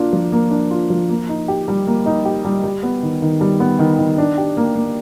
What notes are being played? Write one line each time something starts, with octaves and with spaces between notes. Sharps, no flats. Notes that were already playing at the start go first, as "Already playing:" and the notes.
Already playing: A#3 D4 F4
F3
A#3
D4
F4
F3
A#3
D#4
G4
G3
A#3
D#4
G4
G3
G3
B3
D#3
D#3
G3
B3
D#3
D#3
D4
G4
A#3
A#3